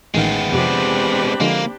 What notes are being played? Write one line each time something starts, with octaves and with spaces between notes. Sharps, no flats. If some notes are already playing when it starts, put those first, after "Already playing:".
A1 D#3 G#3 B3 F5 G5
F2 C3 C4 D4 G4 B5
D3 F3 G#3 A#3